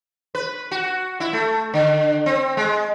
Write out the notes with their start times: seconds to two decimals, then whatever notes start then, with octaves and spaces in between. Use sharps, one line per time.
0.35 B4
0.71 F#4
1.20 E4
1.33 A3
1.74 D3
2.26 C4
2.57 G#3